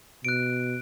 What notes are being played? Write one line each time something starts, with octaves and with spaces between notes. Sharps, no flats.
B2 F#6 D7